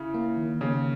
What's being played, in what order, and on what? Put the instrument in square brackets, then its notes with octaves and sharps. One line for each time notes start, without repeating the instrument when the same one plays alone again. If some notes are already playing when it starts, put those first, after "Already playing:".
Already playing: [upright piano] C#3 [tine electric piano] E4
[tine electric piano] A#3
D#3
[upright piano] C#3 [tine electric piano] A#3